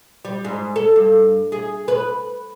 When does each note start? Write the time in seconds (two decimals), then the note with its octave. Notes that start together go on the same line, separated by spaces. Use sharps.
0.25 G3
0.45 G#2
0.76 A4
0.96 G2
1.52 G#4
1.88 B4